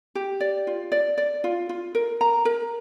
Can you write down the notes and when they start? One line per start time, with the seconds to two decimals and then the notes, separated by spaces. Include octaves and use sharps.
0.15 G4
0.40 D5
0.67 F4
0.92 D5
1.18 D5
1.44 F4
1.69 F4
1.95 A#4
2.21 A#5
2.45 A#4